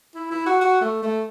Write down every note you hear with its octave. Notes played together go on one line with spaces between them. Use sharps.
E4
E4
F#4
F#4
A3
A3